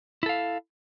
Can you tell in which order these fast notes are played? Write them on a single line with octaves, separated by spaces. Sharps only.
E4 A4 F5